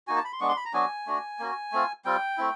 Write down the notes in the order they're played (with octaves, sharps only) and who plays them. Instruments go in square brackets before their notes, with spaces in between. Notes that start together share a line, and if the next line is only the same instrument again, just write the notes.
[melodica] A#3 D#4 F#4 G#5
A5
B5
C6
G#3 B3 D4 C#6
C6
B5
A#5
F#3 B3 D4 F#4 G#5
A3 D4 F#4
A#3 C#4 F#4
A3 C4 F4
G3 C4 F4 G5
A3 C4 E4